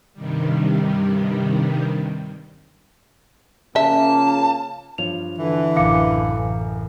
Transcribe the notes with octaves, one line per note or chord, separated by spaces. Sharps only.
G2 C3 D#3 G3
C#3 F3 A#3 E5 A5
G2 F3 C#5 F7
D3 E3
A1 F#2 C#3 F5 D6 C#7